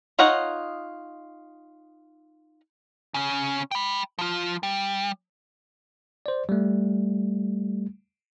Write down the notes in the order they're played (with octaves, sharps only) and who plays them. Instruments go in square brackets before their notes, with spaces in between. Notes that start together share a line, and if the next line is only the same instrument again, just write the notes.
[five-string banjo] D#4 F4 C#5 D#5 F#5
[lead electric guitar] C#3 C#4
G5 B5
F3 F4
G3
[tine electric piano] C5 D5
G3 A3